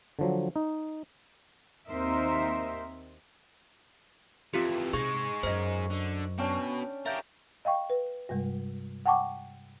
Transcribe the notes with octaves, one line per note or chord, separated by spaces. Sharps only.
D3 F3 F#3
D#4
D#2 C4 D#4 A#4 C5 E5
F2 E3 C4 F4 G4
C3 G#3 D#4 G#4 C#6
F#2 C5 D#5
D3
B2 C#4 D4 G5
G4 A#4 E5 F5 G6
D#5 F5 G5 C#6
B4
G2 C3 G3 G#3
F#5 G5 A5 C#6 D6